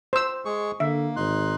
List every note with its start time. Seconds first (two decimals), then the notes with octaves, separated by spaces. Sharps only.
0.13 C5 E6
0.45 G#3 G#4 C#6
0.80 D3 A#3 E5
1.16 G#1 D#4 C6 F#6